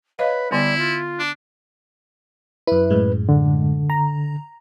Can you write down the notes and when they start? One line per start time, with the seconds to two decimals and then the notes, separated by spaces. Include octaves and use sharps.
0.19 B4 C#5 D#5 F5
0.52 D3 G3 B3 E4
0.78 F4
1.19 D4
2.67 F#2 E4 B4
2.90 F#2 A2 G#3
3.29 D3
3.90 A#5